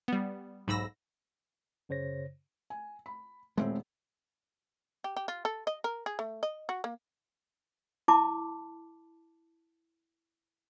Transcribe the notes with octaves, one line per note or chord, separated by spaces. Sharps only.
G3 B3
B1 G#2 B5 E6 A#6
F#2 C#3 C5 C#5 A#6
G#5
B5
D#1 A2 G#3 A#3 C4 E5
G4
G4
F4
A4
D#5
A#4
G#4
A3
D#5
F#4
A#3
E4 A5 B5 D6